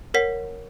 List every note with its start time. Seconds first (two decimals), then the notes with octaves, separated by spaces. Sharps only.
0.14 A#4 C#5 F#5 B6